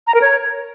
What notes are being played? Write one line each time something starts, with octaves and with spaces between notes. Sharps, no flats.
A#5
A#4
C#5